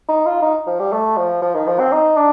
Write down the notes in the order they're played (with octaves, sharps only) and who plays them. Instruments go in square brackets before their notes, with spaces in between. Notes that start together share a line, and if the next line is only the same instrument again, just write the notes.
[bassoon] D#4
F4
D#4
F3
G3
A3
F3
F3
D#3
F3
C4
D#4
D4